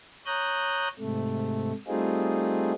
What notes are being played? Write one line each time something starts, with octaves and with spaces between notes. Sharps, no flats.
C#5 A#5 D#6 F#6 G6
G#2 C3 A3
G3 A3 C4 D#4 F4 G#4